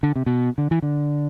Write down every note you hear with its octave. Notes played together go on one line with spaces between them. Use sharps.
D3
C3
B2
D3
E3
D3